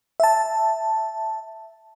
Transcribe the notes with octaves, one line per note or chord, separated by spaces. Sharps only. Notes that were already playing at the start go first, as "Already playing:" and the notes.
E5 A5